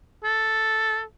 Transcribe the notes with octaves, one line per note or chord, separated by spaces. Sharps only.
A4